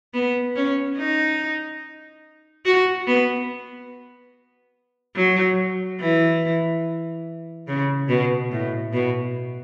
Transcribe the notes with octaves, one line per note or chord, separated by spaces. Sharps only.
B3
C#4
D#4
F#4
B3
F#3
E3
C#3
B2
A2
B2